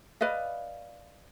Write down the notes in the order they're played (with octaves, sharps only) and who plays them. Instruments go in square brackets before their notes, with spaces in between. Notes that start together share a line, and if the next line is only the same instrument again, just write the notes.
[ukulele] B4 D5 D#5 F5